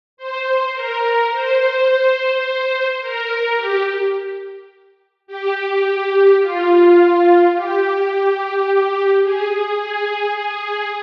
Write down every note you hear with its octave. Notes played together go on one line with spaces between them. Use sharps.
C5
A#4
C5
A#4
G4
G4
F4
G4
G#4
G#4
G#4
G#4